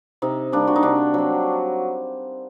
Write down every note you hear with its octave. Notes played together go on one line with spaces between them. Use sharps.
C3 D#4
G3 A#3 D4
F#4
D#4
C3 D4
F#3 C4